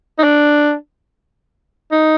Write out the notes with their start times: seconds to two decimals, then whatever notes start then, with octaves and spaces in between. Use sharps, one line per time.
0.18 D#4
0.23 D4
1.91 D#4